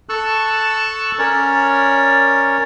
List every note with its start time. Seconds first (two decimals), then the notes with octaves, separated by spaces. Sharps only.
0.09 A4 A5 C#6 E6 F#6
1.19 C#4 A#4 C#5 D5